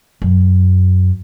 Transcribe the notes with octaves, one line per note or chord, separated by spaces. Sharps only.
F#2